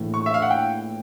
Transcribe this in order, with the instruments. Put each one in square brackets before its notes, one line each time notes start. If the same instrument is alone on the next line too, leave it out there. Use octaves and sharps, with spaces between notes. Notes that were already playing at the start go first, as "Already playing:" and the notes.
Already playing: [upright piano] A#1 A2 E3
[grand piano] C#6
E5
F5
F#5
G5